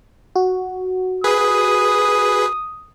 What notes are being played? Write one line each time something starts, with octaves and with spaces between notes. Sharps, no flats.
F#4
G#4 B4 D#6